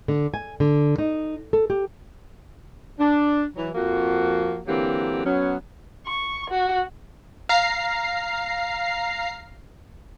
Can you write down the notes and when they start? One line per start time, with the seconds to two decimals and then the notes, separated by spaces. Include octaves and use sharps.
0.08 D3
0.34 G#5
0.60 D3
0.98 D#4
1.53 A4
1.70 G4
2.99 D4
3.56 E3 F#3
3.75 F2 F3 A#3 F#4
4.67 D3 E3 F#3 A#3 C4 G4
5.25 F#3 B3 C#4
6.07 C#6
6.50 F#4
7.49 F5 A#5 C7